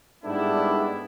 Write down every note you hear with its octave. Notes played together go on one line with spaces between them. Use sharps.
G#2 G3 A3 B3 D4 E4